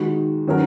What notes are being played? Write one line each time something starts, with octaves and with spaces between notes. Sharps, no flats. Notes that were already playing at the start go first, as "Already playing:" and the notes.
Already playing: D#3 G#3 F#4
D#3 F#3 C#4 A#4